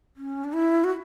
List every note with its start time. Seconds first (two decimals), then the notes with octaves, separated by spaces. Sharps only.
0.17 C#4
0.44 D4
0.53 E4
0.84 F#4